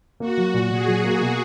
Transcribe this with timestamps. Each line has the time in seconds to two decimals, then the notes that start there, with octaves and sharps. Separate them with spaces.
0.20 A#3 F#4
0.37 F#3
0.54 A#2
0.71 A#2 G#4
0.87 F#3
1.04 A#3
1.21 B2